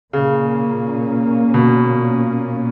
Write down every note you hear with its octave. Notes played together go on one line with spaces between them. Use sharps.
A#2 C#3 A#3 C#4
B2